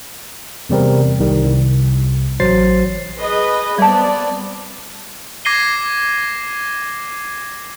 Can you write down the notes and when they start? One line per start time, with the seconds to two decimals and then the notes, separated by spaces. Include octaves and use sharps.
0.69 E2 C3 G3 C4 A#4
1.19 C2 D#3 G3
1.44 C2
2.40 A1 F#3 C5 A6 C7
3.18 G#4 B4 D#5
3.78 G3 B3 C4 D5 A5
5.45 D6 G#6 A#6 C7 D#7 G7